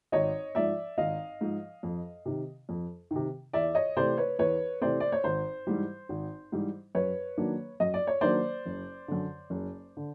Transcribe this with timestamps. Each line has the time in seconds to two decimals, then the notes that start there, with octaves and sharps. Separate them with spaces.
0.12 G#1 C#5 D#5
0.55 G#2 F3 D5 E5
0.98 G#1 D#5 F5
1.41 G#2 F3
1.83 F2
2.26 C3 D#3
2.69 F2
3.11 C3 D#3
3.53 E2 D5 E5
3.75 C#5 D#5
3.96 C3 E3 A3 C4 C5 D5
4.18 B4 C#5
4.39 E2 B4 C#5
4.81 C3 E3 A3 C4 C5 D5
5.00 D5
5.12 C#5
5.24 G#1 C5
5.67 G#2 E3 G3
6.09 G#1
6.52 G#2 E3 G3
6.95 F#2 B4 C#5
7.37 D#3 F#3 A#3 D4
7.80 F#2 D#5
7.94 D5
8.07 C#5
8.21 D#3 F#3 A#3 D4 C5 D5
8.66 F#1
9.08 F#2 D3
9.50 F#1
9.97 D3